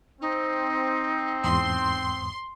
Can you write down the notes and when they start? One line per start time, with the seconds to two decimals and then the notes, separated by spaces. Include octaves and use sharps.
0.21 C4 D#4
1.44 E2 G#2 C6 D#6